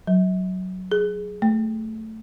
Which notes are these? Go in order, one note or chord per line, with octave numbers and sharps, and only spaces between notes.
F#3
G#4
A3